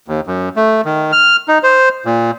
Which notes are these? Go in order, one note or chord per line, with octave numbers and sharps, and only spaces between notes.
D#2
F#2
A3
D#3
F6
D#4
C5
A#2